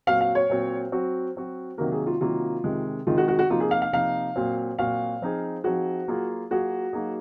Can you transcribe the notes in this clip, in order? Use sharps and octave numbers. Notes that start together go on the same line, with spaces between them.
A#2 F#3 C4 F#4 F5
F5
C#5
A#2 F#3 C4 F#4
F#3 C4 F#4
F#3 C4 F#4
C3 D#3 F#3 A#3 A#4
G#4
F4
C3 D#3 F#3 A#3 F4
C3 D#3 G#3
C3 D#3 G#3 F4
F#4
F#4
F#4
C3 F3 A#3 D#4 F4
G#4
F5
F5
C3 F3 A#3 D#4 F5
A#2 F#3 C4 F#4
A#2 F#3 C4 F#4 F5
F3 C4 D#4 G#4
F3 C4 D#4 F#4 G#4
F#3 A#3 F4 G#4
F#3 A#3 F4 F#4 G#4
F#3 A#3 D#4 G#4